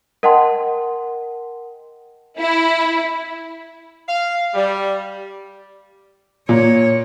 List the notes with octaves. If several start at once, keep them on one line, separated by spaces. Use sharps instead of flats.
A#4 D#5 F#5 G5 A5 C6
E4
F5
G3
A#2 C#5